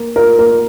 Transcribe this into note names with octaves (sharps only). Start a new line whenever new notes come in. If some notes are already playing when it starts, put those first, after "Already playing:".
Already playing: A#3
F4 A#4
A#3 A#4